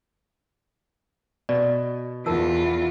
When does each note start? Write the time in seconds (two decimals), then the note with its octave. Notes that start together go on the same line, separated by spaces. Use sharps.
1.49 B2 D5
2.26 E2 F4 A#4 A5 E6